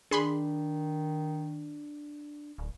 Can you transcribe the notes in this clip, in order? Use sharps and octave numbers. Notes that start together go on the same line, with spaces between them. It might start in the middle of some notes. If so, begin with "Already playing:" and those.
D#3 D4 G#4 B5 C6
D1